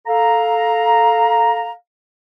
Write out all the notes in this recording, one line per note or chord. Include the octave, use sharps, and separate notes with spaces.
A4 F5 A#5